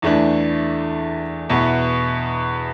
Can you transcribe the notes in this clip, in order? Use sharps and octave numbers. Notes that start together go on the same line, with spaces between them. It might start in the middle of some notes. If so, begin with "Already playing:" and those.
E2 E3 A3 D4
E2 B2 B3 E4